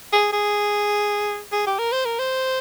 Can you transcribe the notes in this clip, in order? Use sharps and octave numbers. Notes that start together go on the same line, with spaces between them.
G#4
G#4
G#4
G4
A#4
C5
A#4
C5